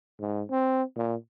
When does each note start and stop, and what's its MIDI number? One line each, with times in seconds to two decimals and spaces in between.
0.20 0.43 44
0.51 0.83 60
0.97 1.15 46